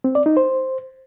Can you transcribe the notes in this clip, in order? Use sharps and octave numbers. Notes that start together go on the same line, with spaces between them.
C4
D5
D#4
C5